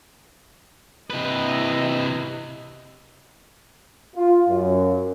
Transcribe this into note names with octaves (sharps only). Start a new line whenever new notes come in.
C3 E4 B4 D#5
F4
F#2